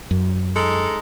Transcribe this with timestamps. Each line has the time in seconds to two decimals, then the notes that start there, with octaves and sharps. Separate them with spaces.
0.11 F#2
0.55 G#3 D#4 A4